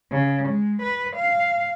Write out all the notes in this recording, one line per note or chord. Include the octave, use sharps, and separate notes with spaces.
C#3
G#3
B4
F5